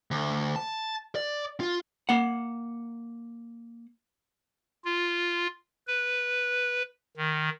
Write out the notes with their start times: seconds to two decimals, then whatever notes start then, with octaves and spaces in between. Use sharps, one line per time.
0.11 D2
0.56 A5
1.16 D5
1.60 F4
2.09 A#3 F#5
4.85 F4
5.87 B4
7.17 D#3